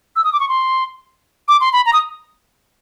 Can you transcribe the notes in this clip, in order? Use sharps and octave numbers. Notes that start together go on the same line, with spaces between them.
E6
D#6
D6
C#6
C6
D6
C6
B5
A#5
D#6